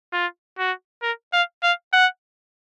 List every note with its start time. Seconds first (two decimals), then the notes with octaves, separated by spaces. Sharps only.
0.13 F4
0.58 F#4
1.02 A#4
1.33 F5
1.63 F5
1.93 F#5